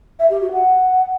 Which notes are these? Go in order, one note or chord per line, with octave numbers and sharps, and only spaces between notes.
E5
G4
F#4
F#5